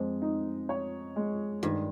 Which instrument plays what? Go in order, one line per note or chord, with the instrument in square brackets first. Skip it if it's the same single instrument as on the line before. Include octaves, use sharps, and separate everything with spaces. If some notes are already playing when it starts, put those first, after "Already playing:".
Already playing: [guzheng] F2 [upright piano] G#3
[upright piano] D#4
C#5
G#3
[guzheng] G2 [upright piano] D#3